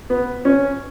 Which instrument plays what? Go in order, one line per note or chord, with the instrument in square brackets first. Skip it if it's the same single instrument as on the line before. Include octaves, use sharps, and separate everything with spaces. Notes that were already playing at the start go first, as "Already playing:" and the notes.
[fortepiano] B3
C#4